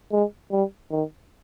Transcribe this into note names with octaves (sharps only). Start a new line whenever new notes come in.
G#3
G3
D#3